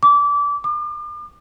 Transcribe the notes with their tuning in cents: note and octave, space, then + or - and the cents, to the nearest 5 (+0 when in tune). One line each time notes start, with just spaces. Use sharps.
D6 -25
D6 +45